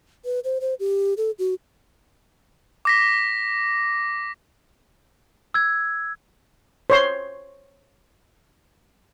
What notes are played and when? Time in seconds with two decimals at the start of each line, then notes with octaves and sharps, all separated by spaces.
0.25 B4
0.44 C5
0.61 C5
0.80 G4
1.17 A4
1.39 F#4
2.85 D6 A#6 B6
5.54 E6 G#6
6.90 C5 C#5 C6